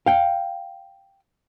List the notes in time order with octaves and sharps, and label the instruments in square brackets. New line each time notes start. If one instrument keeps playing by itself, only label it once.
[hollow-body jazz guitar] F5 G5